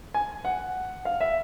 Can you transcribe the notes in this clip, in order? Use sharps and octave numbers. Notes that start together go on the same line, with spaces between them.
G#5
F#5
F5
E5